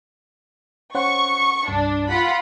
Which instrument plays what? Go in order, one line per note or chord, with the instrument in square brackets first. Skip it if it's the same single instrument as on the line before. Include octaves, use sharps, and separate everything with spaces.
[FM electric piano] C#4 C5 F#5 [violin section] C#6
[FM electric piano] C2 G2 [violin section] D4
[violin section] F4 F#5 B5